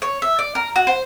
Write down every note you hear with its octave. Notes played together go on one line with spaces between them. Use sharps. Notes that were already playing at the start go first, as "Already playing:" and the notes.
C#5
E5
D5
A#4
F#4
C5